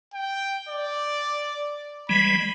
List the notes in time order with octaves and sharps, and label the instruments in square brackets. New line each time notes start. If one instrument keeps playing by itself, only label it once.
[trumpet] G5
D5
[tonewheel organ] E3 G3 G#3 [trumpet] B5